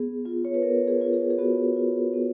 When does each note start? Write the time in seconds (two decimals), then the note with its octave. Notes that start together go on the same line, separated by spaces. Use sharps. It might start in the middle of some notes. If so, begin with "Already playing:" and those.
Already playing: B3 G#4
0.25 F4
0.45 C#5
0.54 B4
0.62 B3 A#4
0.88 G#4
1.01 F4
1.13 G#4
1.30 G#4
1.38 B3 F#4
1.76 F4
2.14 B3